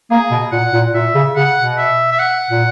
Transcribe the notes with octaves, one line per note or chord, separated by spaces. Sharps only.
A#3 G#4
B2
A#2 F#5
A#2
A#2 E5
C#3
C#3 F#5
B2
E5
E5
F#5
A#2